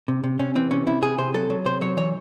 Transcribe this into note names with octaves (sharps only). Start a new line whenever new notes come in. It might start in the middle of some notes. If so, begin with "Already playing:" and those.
C3
C3
C3 C#4
E3 C4
C3 C#4
C3 E4
C3 G#4
C3 C5
F#3 A4
F#3
C3 C5
F#3 C#5
E3 C#5